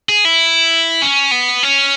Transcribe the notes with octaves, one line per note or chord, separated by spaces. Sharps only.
G#4
E4
C#4
B3
C#4